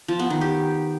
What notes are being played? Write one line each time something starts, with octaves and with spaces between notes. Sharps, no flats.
F3
B3
D#3
G4